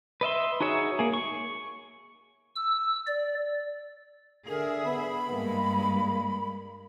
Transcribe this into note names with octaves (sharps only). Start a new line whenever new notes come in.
B4 D#5 E5 C6
D#4 F#4 G#4 C#5 E5
A#3 G#4
C#6
E6
D5
D3 G#4 A#4 E5
B3 B5
G2 G#3 A#3